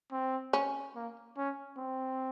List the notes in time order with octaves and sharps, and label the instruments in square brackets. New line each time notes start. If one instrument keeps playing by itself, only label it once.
[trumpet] C4
[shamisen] C#4
[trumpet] A#3
C#4
C4